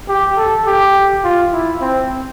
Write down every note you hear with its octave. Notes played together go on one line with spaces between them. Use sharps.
G4
A4
G4
F4
E4
C4